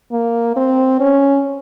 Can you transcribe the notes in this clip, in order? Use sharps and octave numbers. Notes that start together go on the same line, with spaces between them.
A#3
C4
C#4